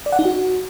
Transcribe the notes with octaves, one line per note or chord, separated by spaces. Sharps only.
D5
F#5
D#4
F#4